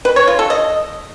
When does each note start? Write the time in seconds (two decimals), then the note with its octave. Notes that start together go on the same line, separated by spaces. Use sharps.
0.05 B4
0.16 C#5
0.28 F4
0.39 A4
0.50 D#5